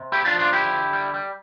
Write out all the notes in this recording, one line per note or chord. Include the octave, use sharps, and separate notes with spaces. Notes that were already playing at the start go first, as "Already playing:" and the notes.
Already playing: C3
A3 E4 G4
D4 F4
F3
D4 F4
D3 E4 G4
D3
G3
G3